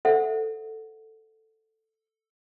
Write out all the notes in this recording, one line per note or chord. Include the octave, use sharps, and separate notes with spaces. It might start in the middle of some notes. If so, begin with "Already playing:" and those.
A4 C5 E5 F#5